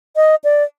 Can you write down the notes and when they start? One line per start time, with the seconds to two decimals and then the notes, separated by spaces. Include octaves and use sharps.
0.16 D#5
0.44 D5